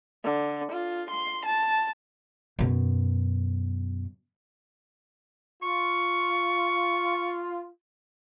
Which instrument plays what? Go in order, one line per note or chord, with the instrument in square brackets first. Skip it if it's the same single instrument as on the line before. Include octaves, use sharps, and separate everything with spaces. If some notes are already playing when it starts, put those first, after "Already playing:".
[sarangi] D3
F4
C6
A5
[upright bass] F#2 B2
[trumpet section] F4 [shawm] C#6